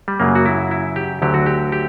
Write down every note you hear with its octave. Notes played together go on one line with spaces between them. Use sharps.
G3
F#2 C#3 F#3 A#3
F#4
E4
E4
G4
D2 D3 F#3 G4
F#4
G4
G4